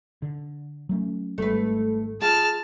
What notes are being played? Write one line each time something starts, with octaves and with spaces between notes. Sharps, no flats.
D3
F#3 A3 C#4
G#1 G3 A3 B4
F4 G#4 A5 F6